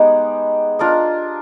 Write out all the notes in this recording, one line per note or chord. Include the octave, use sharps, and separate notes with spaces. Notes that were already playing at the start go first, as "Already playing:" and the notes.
Already playing: G#3 B3 D#4 G4
D4 F4 A#4 D#5